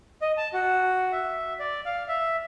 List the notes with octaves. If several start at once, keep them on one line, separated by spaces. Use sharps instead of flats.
D#5
A5
F#4
E5
D5
F5
E5